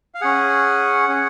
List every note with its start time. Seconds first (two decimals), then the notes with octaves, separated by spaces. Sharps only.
0.14 F5
0.21 C#4 G#4 F#5
1.09 C#4 G#4